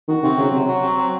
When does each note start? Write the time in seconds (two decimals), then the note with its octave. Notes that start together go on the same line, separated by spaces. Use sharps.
0.08 D#3 F#4
0.23 C3 C4
0.38 C#3 F#3
0.53 C3 F#3
0.68 F#4
0.82 C4
0.98 F#3